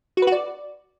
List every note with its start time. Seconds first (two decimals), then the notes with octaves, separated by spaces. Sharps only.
0.17 F#4
0.22 B4
0.27 F#4
0.32 D5